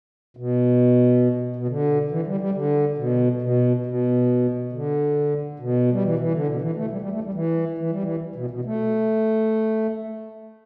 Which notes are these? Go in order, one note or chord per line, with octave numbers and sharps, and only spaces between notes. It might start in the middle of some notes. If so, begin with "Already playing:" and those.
B2
B2
D3
E3
G3
G3
D3
B2
B2
B2
D3
B2
G3
E3
E3
D3
B2
E3
A3
G3
G3
A3
G3
E3
E3
G3
E3
B2
B2
A3